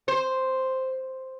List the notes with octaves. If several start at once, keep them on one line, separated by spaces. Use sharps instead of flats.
C5